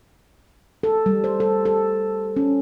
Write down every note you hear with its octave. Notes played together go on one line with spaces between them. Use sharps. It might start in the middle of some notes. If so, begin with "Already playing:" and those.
A4
G3
C5
A4
A4
C#4